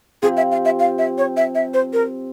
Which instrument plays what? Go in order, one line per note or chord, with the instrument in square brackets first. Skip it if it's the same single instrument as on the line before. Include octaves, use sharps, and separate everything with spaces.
[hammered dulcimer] F3 C4 G4 [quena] G#4
[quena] E5
F5
E5
F5
E5
C#5
E5
E5
C5
A#4